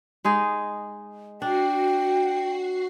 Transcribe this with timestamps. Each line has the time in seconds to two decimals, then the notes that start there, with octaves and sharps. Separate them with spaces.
0.24 G#3 D#4 G#4
1.42 D4 F#4 G5 C7